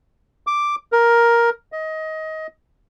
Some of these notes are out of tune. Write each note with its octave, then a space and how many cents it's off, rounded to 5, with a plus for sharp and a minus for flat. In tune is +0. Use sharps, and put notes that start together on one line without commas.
D6 +0
A#4 +10
D#5 +20